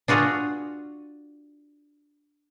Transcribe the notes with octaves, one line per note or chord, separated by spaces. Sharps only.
D4 F4 F#4 G#4